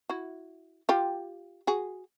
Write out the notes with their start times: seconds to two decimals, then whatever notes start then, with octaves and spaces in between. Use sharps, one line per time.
0.10 E4 F#4
0.89 F4 G4
1.67 F#4 G#4